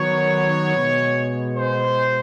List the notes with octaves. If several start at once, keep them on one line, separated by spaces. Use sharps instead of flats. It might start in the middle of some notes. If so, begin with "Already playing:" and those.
Already playing: D#3 F#3 B3 C#5
B2 G#3 B3
C5